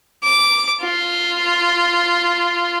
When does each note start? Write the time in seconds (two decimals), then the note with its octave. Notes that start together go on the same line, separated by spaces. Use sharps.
0.23 D6
0.82 F4